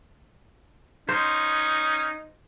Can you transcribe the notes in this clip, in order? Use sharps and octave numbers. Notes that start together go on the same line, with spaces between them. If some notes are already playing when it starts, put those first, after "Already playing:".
C#4 D#4 C5